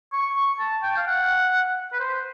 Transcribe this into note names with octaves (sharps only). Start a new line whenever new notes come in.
C#6
C#6
A5
G5
F5
F#5
B4
C5